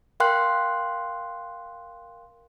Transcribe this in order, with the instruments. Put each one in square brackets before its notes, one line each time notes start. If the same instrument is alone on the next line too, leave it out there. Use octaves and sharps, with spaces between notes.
[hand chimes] A#4 F5 G5 C6 F#6